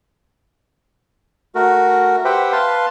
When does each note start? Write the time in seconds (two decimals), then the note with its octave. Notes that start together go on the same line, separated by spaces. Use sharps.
1.55 A3 F#4 A#4
2.25 G4 B4 C5 E5 F#5 G5
2.52 B4 F5 A5 C6